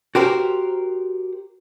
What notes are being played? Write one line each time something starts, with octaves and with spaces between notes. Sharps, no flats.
F#4 G4 A#4 C5